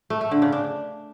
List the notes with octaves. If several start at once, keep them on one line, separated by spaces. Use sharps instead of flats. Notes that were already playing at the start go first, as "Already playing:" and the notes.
A3
A3
D3
C#3
D4